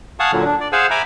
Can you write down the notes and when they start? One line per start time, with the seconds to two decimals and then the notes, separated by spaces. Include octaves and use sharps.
0.20 F5 F#5 G#5 A5 C#6 D#6
0.33 A#2 D3 F#3
0.45 D4
0.61 D5
0.73 G#4 C5 F5 F#5 G#5 E6
0.91 E5 G#5 A#5 B5 D6